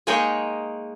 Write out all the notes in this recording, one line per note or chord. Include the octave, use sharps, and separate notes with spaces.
G#3 A#3 D#4 G#4 C#5 G5